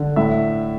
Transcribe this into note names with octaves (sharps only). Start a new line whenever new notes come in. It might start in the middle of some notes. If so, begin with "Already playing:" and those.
Already playing: D3
A2 E5